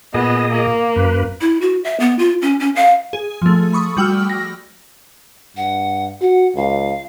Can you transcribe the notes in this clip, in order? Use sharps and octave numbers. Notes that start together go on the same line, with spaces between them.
A#2 B3 G#4 D#5
A#3
F#2 B4
E4
F#4
E5
B3
F4
C#4
C#4
F5
G#4
F3 A3
B5 C#6 D#6
G3 F#4 G5 E6 F6
A#6
G2 F#5
F#4 F#5
C#2 F5